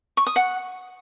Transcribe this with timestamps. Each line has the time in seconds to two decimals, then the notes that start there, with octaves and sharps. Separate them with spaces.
0.17 C#6
0.27 D#6
0.36 F#5